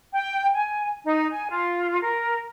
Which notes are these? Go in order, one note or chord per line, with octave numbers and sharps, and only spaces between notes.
G5
G#5
D#4
G#5
F4
A#4